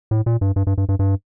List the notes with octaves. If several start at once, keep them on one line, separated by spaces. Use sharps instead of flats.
A2
A#2
G2
G2
G2
G2
G2
G2